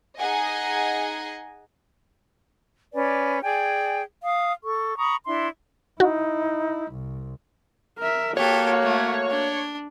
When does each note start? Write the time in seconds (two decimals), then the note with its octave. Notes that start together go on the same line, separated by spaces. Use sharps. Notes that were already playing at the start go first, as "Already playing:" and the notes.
0.19 D#4 G#4 D#5 F#5 G#5
2.94 C#4 B4 D5 G#5
3.43 G#4 D5 G5 G#5
4.23 F5 D#6
4.63 A4 C#6
4.97 A#5 B5 C#6 D#6
5.26 D4 E4 E5 C6
6.00 D#4 E4 F#4
6.92 C2
7.99 A#4 E5
8.37 A#3 F#4 G4 A4 C#5
8.83 A3
9.29 D4